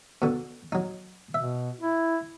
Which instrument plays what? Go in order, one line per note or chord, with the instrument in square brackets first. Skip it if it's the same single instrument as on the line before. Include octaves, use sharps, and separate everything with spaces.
[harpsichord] B2 D3
F#3 D#4
[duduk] B2 [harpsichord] E5
[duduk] E4